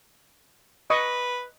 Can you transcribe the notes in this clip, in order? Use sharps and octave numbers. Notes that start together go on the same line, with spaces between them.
B4 D#5 C#6